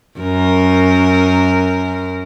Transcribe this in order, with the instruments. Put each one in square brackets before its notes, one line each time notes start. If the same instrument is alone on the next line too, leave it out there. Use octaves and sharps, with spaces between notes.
[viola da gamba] F#2 A#4